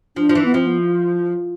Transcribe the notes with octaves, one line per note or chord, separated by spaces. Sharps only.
F3 D4
F3
E3
B3
F3 C4
B3